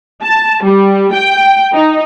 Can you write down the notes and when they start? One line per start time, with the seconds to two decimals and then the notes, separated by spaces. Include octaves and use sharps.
0.22 A5
0.63 G3
1.12 G5
1.74 D#4